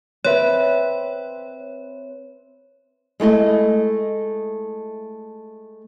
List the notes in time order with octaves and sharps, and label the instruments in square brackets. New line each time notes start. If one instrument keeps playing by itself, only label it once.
[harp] C4 B4 E5 [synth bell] C#5
[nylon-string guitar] G#3 A3 E4 D#5